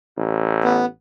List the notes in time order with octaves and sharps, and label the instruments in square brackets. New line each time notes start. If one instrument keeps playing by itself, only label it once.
[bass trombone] A1
[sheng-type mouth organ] B3